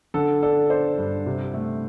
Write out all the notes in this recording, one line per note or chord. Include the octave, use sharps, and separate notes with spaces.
D3 A4
D4 A4
D4 C5
G2
C3
A3